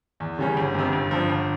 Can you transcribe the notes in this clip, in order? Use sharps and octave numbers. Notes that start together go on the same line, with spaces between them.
E2
C#3 G3 C#4
G1
F2 C3
G1
G2 F3
G1